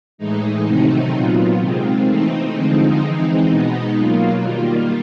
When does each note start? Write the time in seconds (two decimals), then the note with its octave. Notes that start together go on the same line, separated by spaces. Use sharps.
0.18 A2 E3 G#3 D#4
0.66 C3 D#3 F#3 A3 C4
1.13 A#2 F#3 B3 F4
1.59 C3 D#3 G#3 C4
2.07 E3 A3 C4 D#4
2.54 D3 F3 G#3 C4 D#4
3.01 E3 G#3 C4
3.49 B2 G#3 B3 D#4
3.96 B2 F#3 A#3 F4
4.43 D#3 G3 A#3